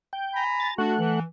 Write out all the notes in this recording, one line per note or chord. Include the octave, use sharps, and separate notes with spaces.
G5
G#5 A#5 B5
A6
A3 D4 F#4 F#5
E3